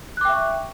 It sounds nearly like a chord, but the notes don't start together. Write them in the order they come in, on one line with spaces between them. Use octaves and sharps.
F#6 D6 G5 E5 C#6